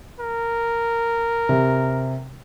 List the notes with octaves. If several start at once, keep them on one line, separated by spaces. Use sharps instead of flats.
A#4
C3